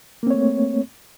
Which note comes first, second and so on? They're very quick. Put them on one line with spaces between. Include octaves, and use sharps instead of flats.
A#3 C4 C#5 A3